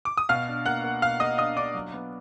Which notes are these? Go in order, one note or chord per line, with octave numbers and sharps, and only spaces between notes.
D6
D#6
B2 F5 F6
D4
A#3 F#5 F#6
A#3
B2 F5 F6
A#3 D#5 D#6
D4 D#5 D#6
D4 D5 D6
F#3
B3